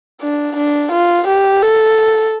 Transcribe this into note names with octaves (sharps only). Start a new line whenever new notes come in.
D4
D4
F4
G4
A4